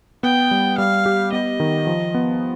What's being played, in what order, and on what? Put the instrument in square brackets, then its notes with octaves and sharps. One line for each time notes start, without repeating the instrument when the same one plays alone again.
[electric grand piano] B3 [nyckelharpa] G5
[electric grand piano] G3
[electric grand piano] G3 [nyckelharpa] F5
[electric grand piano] G4
[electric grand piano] B3 [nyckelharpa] D#5
[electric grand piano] D#3
F3
B3